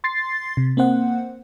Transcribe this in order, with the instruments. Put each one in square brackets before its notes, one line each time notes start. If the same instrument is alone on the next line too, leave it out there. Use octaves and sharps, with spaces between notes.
[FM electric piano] C6 A6 C7
C3
A#3 C4 C5 F#5